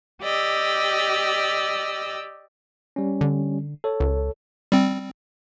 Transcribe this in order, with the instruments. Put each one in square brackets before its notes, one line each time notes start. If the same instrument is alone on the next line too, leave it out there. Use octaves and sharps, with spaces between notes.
[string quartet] G4 D5 D#5 E6
[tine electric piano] G3 C#4
[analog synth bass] D3
[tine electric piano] A4 C#5
[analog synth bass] C#2
[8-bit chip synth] G3 C4